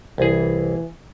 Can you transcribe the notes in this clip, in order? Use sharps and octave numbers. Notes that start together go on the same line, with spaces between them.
C2 E3 G#4